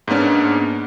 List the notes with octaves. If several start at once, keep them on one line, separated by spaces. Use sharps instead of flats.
G#2 A#3 B3 C#4 D4